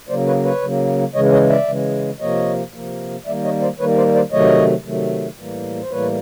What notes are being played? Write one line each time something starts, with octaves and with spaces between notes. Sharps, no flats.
C#3 F#3 A#3 C5 D5
B4 C#5
B4 C#5
C#3 F#3 A#3
C#3 E3 G#3 C#5 D#5
C#5 D#5
D5 E5
C#3 E3 G#3
C3 F3 A#3 C#5 D#5
C3 F3 A#3
D#3 G3 A#3 D5 E5
C#5 D#5
C5 D5
D#3 G3 A#3 B4 C#5
C5 D5
C5 D5
C3 D#3 F#3 A3 C#5 D#5
C3 D#3 F#3 A3
A2 E3 G3 A#3
C5
A2 E3 G3 A#3 B4 C#5